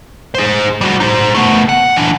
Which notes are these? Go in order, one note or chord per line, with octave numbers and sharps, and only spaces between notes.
G#4 C5
G3 F#4
D#4 C5
A3 B3
F#5
E3 D4